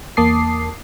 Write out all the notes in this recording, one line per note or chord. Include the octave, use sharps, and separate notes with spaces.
E2 A#3 A5 D6 D#6 C7